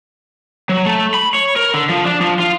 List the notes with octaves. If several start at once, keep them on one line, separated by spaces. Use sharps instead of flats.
F#3
A3
B5
C#5
A#4
D3
F3
D4
F3
F4